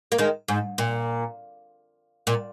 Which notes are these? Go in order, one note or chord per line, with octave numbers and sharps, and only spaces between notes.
A#3
D#3 G#3
G#2
A#2
A#2